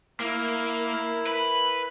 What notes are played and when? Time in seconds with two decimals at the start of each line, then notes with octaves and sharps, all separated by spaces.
0.20 A#3 E4 A#4
1.27 B4